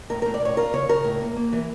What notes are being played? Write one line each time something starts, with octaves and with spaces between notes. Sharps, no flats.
A2 A#4
A2 A#4
D5
A2 C#5
F4 A#4
C#3 C#5
C#3 A#4
A2
A#3
A#3
E3